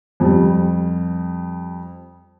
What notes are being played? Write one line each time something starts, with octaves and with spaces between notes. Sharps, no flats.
F2 G3